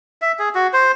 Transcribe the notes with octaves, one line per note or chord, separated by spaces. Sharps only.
E5
G#4
F#4
C5